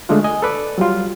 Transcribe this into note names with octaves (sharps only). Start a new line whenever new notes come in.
D3 G#3 A3 D4 F4
D#5 G#5
A4 B4 D5
F#3 G3 F4